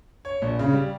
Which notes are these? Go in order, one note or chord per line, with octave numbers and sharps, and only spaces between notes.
C#5
A#1
C#3
G3